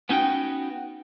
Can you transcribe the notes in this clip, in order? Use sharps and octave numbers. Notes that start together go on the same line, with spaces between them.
B3 C#4 D#4 F#4 G5